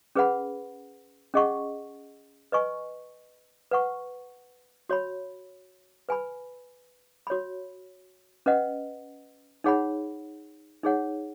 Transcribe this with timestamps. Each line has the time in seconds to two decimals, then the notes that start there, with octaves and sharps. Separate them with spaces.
0.15 C#4 G#4 B4 F#5 B5
1.34 C#4 G#4 D#5 F#5 C#6
2.52 B4 D#5 G#5 C#6
3.71 B4 F#5 C#6
4.89 F#4 C#5 B5
6.09 B4 G#5 B5
7.27 F#4 C#5 B5
8.46 C#4 B4 D#5 F#5
9.64 D#4 G#4 C#5 F#5 B5
10.83 D#4 G#4 C#5 F#5